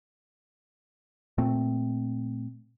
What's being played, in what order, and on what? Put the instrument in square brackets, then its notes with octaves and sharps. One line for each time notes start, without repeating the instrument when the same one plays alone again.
[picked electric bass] A#2 A3 C4